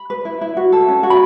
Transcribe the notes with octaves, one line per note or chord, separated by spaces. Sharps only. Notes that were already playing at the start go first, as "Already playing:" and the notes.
Already playing: B5
B4
E4
E4
F#4
A4
C#4
F#4
B5